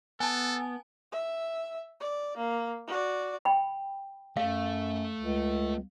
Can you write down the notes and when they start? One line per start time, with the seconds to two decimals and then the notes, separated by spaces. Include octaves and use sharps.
0.20 B3 A4 G#5 A5
1.12 E5
2.00 D5
2.37 A#3
2.87 F#4 D5
3.45 G5 B5
4.37 F#2 A3 F5
5.17 C#2